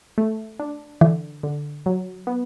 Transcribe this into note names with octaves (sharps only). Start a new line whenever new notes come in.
A3
D4
D3 E3
D3
F#3
B3